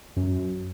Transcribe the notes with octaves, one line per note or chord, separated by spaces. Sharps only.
F#2